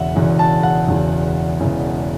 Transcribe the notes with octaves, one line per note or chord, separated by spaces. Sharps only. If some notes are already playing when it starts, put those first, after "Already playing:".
Already playing: E1 E2 C#3 E3 E5 F#5
E1 E2 C#3 E3
A5
F#5
E1 E2 C#3 E3
E1 E2 C#3 E3